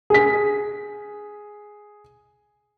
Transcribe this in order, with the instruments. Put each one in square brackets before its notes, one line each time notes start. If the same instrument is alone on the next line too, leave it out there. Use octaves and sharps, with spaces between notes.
[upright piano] G#4 B6